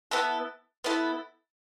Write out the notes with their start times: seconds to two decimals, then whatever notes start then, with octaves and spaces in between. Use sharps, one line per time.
0.11 B3 E4 A4
0.84 B3 E4 A4